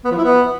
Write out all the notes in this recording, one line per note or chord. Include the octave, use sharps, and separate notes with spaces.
B3
F3
E4
B3